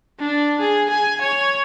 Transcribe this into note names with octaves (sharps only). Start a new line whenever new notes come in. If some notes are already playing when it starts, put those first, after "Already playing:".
D4
G#4
G#5
C#5